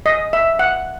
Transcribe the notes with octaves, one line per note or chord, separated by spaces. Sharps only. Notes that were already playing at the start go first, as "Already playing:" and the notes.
D#5
E5
F#5